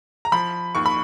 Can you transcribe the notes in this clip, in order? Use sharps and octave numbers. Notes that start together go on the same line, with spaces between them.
A#5
F3 B5
D#2 C#6
B5